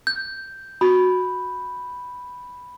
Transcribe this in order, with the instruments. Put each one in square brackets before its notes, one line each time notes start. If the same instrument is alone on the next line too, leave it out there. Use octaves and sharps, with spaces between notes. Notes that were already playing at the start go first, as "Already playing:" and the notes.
[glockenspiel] G6
[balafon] F#4 [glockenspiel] B5